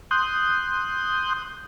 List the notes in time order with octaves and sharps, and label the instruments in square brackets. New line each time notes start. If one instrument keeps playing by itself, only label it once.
[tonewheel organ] C6 D#6 F#6 G6